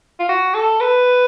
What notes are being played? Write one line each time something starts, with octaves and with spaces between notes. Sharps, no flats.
F4
F#4
A4
B4